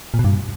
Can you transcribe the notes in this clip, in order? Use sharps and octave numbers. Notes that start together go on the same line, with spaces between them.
A#2
B2
G2